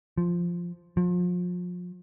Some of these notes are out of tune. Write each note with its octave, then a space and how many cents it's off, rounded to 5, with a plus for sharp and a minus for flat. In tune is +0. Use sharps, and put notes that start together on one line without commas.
F3 -5
F3 +35